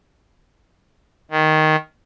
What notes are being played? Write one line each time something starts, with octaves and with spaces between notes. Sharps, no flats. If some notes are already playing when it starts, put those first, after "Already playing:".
D#3